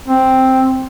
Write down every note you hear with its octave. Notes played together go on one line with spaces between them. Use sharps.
C4